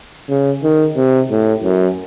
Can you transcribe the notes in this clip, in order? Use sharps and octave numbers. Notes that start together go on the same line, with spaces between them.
C#3
D#3
C3
A2
F#2